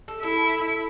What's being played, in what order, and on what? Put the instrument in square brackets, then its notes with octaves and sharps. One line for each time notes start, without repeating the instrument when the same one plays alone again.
[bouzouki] A4
[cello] E4 [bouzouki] A4